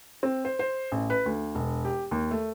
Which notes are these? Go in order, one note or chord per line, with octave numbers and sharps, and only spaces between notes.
C4
C5
C5
A1
B4
D2
E1
G4
D#2
A3